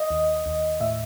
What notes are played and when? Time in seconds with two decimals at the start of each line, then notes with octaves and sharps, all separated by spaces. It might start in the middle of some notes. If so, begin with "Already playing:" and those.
Already playing: D#5
0.10 D#2
0.46 D#2
0.80 A2 E5